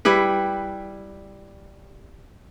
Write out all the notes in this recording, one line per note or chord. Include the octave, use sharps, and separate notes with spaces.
G3 E4 G4 B4